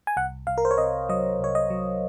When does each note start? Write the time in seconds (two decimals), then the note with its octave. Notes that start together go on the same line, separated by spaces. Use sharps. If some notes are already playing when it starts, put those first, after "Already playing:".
0.07 G#5
0.17 C2 F#5
0.47 C2 F5
0.58 A#4
0.65 C5
0.71 C#5
0.78 C3 D#5
1.09 F#3 D#5
1.39 C2 C#5
1.55 D#5
1.70 F#3